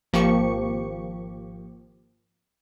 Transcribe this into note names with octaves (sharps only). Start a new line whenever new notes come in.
G#1 F3 A#3 G4 C#6 C#7